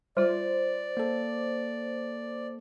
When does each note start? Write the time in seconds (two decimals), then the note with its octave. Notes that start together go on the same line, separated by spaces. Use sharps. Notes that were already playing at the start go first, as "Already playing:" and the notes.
0.17 G3 F4 C5 D5
0.97 A#3 A4